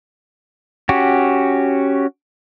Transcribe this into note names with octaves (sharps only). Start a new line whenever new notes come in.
C#4 F#4 G4